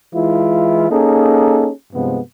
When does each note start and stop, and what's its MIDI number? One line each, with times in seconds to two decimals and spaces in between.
0.14 0.89 52
0.14 0.89 56
0.14 0.89 64
0.14 0.89 65
0.91 1.70 58
0.91 1.70 61
0.91 1.70 63
0.91 1.70 68
0.91 1.70 69
1.93 2.19 43
1.93 2.19 48
1.93 2.19 53
1.93 2.19 56
1.93 2.19 59